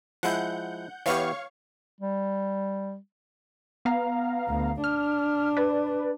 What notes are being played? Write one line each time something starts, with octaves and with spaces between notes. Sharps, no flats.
F3 G#3 E4 F#5 G6
E3 B3 G4 C#5 F5 C#6
G3
B3 F5 A#5
D2
D4 F6
B4 D5